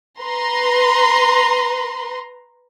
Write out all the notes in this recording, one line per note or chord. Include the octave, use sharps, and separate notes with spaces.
B4 A#5 C6